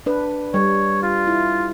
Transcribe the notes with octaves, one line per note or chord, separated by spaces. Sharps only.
D4 B4
G3 C#5
F4
E4